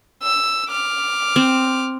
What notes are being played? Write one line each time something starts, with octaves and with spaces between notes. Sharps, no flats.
E6
D6 F6
C4